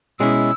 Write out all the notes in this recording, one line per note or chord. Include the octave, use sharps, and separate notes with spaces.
B2 G#3 C#4 E4 E6